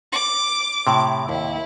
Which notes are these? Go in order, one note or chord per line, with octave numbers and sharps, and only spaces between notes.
D6
A2 C3
D#2 E4